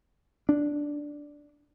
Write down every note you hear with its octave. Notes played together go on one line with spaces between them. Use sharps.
D4